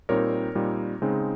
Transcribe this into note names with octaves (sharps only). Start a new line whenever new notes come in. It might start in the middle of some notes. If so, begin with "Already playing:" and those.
A#2 G3 C4 D#4 A#4 C#5
A#2 G3 C4 D#4
C#3 G#3 C4 D#4